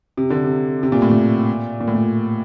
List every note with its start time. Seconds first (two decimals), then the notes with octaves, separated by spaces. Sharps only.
0.17 C3
0.30 D3
0.44 C3
0.83 C3
0.92 A#2
1.02 A2
1.11 A#2
1.80 A#2
1.88 A2
1.95 A#2